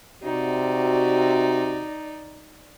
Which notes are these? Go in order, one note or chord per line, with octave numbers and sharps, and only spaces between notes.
C3 D#4 F#4 D5